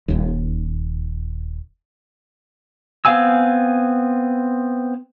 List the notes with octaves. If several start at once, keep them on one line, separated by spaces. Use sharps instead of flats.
D#1 D#2
B3 C4 F5 G#5 E6